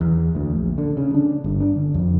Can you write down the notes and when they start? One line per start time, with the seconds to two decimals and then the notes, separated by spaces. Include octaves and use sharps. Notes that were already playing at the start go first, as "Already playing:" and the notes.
0.01 E2
0.35 D2
0.56 A#1
0.78 D3
0.97 C#3
1.14 D4
1.44 G1
1.61 D4
1.76 D3
1.94 F2